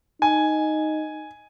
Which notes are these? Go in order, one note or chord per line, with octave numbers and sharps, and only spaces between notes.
D#4 G#5